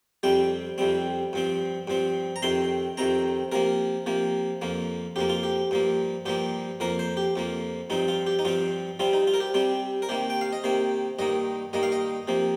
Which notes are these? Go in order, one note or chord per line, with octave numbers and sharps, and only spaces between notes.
F2 C3 G3 C4 G5
F2 C3 G3 C4
G2 F3 C4
G2 F3 C4
A#5
F2 C3 D#3 C4 C6
F2 C3 D#3 C4 A#5
C3 F3 A#3 A#4
C3 F3 A#3
F2 F3 A#3
F2 F3 A#3 G4
F4
G4
G2 F3 A#3
G2 F3 A#3 G4
F2 F3 A#3 A#4
C5
G4
F2 F3 A#3
G2 F3 C4 D#4
F4
G4
D#4
G2 F3 C4 F4
C3 G3 C4 F4
D#4
F4
A#4
G4
C3 G3 C4 G4
A#4
C3 D#3 A#3 G4
G5
F5
D#5
C3 D#3 A#3 C5
G2 D#3 A#3 D#5
G2 D#3 A#3 D#5
F5
D#5
C3 F3 A#3